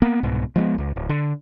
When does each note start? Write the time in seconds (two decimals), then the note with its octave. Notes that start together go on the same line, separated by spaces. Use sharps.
0.02 A#3 B3
0.23 C2 G#2 B2
0.56 F3 G#3 A3 B3
0.75 D1 C#2
0.96 D1
1.09 D3